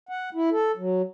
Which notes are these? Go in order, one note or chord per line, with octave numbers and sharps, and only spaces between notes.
F#5
E4
A4
F#3